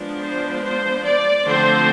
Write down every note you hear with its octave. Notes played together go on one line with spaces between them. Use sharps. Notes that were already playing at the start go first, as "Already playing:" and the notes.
Already playing: F3 G#3 B3 D4
C5
C5
D5
D3 F3 A3 C4 C5